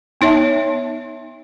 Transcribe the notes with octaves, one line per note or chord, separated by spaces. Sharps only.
B3 D#4 C#5 E5 A5